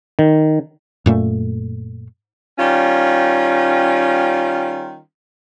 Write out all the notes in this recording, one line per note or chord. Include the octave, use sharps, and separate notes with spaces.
D#3
F#2 A#2 A3
D#3 G3 C#4 F4